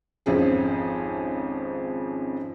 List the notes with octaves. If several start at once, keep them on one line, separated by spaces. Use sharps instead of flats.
G#1 F2 F3 C#4 G#4